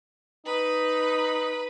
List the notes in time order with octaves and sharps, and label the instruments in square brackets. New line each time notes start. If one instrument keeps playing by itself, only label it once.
[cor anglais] D#4 [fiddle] B4